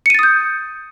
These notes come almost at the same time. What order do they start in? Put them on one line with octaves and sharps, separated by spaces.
C#7 D#7 A6 D#6 G6